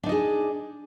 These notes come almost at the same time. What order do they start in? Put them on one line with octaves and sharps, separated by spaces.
D4 D#4 D#5 G#4